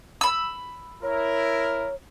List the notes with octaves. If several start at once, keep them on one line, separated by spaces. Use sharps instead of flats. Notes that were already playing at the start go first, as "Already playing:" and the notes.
B5 E6
E4 A#4 C#5